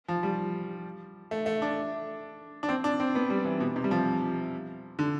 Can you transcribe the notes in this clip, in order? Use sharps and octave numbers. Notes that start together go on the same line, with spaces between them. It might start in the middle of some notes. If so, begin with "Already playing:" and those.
F3
G3
A3
A3
D4
D4
C4
D4
C4
B3
G3
E3
B2
C3
G3
F3
D3